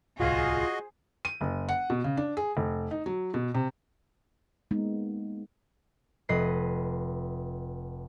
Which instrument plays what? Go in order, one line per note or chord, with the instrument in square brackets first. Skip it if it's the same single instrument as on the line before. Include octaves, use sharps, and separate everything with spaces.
[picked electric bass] D1 C2 [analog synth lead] F4 [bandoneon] F#4 D#5 [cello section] G#4 C5
[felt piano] D#7
F#1
F#5
B2
C#3
D4
G#4
F1
D#4
F#3
B2
C3
[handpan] G#3 A#3 B3 D#4
[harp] F1 B4 D#5 C7